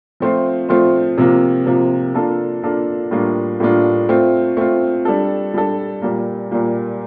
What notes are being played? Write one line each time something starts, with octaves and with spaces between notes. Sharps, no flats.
F3 A3 C4 F4 C5
F3 A3 C4 F4 C5
C3 F3 A#3
C3 F3 A#3
A#3 D4 F4 A4
A#3 D4 F4 A4
A2 G3 A#3 D4 F4
A2 G3 A#3 D4 F4
A3 C4 F4
A3 C4 F4
G3 D4 A4
G3 D4 A4
A#2 G3 A#3
A#2 G3 A#3